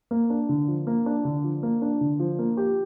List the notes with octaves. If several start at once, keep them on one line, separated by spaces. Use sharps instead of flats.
A#3
D4
D3
F3
A#3
D4
D3
F3
A#3
D4
D3
F3
A#3
G4